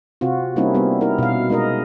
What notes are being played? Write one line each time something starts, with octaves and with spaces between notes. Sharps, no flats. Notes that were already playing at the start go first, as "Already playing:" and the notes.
C3 C4 F4 F#4
G3 A#3 C4 C#4 D#4 E4
G3 B3 C4
D#4 E4 A#4
B2 F5
G#3 D#4 A#4 D#5